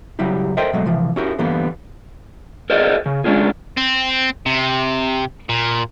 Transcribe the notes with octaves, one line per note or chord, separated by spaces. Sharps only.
C#3 F#3 G3 E4 G4
A4 A#4 C5 D#5 E5 G5
B2 F#3 G#3 A3
C3 E3 F3
C#4 E4 F#4 G4 A#4
D3 E3 G3 A#3 B3
G#4 A#4 C5 D5 D#5
C#3
G#3 C#4 D4 F4 G#4
C4
C3
A#2